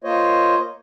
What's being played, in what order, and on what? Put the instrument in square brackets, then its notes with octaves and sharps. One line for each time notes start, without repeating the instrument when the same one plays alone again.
[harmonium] A#3 F4 C5 C#5 D#5